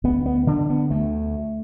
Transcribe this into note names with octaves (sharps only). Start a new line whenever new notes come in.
D2 B3
B3
D3 D4
B3
D2 A3